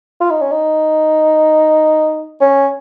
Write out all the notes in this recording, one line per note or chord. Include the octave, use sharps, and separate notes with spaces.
F4
D#4
C#4
D#4
C#4